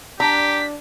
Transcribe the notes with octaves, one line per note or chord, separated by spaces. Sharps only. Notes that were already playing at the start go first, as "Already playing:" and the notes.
D4 G4 A#5 B6